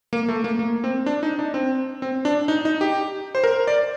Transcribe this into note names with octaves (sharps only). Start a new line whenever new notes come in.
A#3
A3
A#3
A#3
C4
D4
D#4
D4
C4
C4
D4
D#4
D#4
G4
C5
A#4
D5